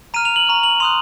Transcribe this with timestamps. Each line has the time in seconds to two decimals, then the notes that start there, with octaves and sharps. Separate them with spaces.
0.14 A#5 F6 D#7
0.25 F7
0.36 F#7
0.47 A#5 C#6 F6
0.63 F#7
0.80 C6 D#6 F#6 F7